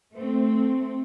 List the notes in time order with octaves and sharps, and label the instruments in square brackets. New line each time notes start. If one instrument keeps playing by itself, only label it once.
[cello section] A3 C4